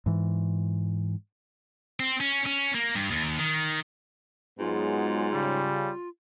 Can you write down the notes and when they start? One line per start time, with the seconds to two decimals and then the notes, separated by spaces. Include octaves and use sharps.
0.06 G#2 E3
2.00 C4
2.21 C#4
2.46 C#4
2.75 A#3
2.95 G2
3.10 D#2
3.39 D#3
4.59 G#2 F#3 G#3 B3 F4
5.33 C#3 G3